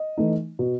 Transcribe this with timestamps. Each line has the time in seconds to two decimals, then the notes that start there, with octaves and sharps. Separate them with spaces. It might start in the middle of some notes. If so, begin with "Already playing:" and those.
Already playing: D#5
0.17 E3 A3 D#4
0.59 B2